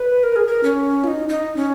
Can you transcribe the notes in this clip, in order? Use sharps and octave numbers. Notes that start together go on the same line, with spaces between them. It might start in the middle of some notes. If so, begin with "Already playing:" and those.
Already playing: B4
A#4
G#4
A#4
C#4
F4
D#4
D#4
C#4